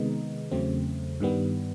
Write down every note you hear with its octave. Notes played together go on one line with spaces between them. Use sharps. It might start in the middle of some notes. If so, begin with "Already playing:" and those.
Already playing: C3 D#3 G#3 B3 D#4
E2 C#3 F#3 A3 C4
G2 D#3 G3 B3